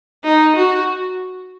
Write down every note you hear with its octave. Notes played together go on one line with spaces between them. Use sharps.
D#4
F#4